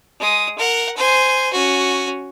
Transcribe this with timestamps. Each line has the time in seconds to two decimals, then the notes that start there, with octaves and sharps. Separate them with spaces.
0.19 G#3 D#6
0.58 A#4 F#5
0.97 C5 G#5
1.53 C#4 F#4